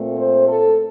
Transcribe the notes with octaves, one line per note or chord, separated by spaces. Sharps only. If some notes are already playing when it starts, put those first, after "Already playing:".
Already playing: A#2 A3 C4
C5
A4